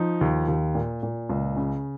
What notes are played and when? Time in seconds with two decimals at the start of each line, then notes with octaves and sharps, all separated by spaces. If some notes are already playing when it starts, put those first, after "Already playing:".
Already playing: F3 D#4
0.21 D#2
0.48 D#2
0.75 A#2
1.03 A#2
1.30 C#2
1.56 C#3